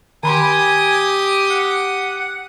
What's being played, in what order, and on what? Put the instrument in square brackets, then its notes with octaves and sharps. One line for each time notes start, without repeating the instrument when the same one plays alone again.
[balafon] D#3 B5 C6 [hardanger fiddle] G4 D#6 [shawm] G#5
[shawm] F#5